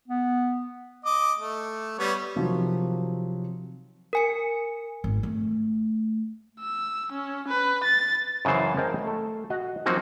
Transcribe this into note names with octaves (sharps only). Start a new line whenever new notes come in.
B3
D#5 D6
A3
G3 B3 C#5
C3 D#3 F3 F#3
A#4 G#5 C#7
G#1
A3
E6
C#4
B4
A6
F#2 C#3 E3 C5
G#4 A#4 C5 D#5 G5 A5
A3 A4
F#4 D#5
F3 F#3 A#3 C4 D#4 F#4